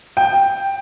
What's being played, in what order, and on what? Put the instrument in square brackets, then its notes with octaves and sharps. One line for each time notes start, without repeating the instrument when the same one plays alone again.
[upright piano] G5